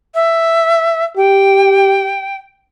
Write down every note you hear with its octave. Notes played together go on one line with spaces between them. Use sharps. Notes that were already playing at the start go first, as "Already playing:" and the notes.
E5
G4 G5